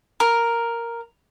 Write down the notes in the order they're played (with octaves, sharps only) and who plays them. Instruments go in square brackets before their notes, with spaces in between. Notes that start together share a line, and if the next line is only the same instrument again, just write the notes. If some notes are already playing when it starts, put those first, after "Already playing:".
[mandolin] A#4